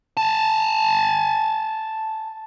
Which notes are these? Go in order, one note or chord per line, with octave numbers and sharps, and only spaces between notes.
G#5 A5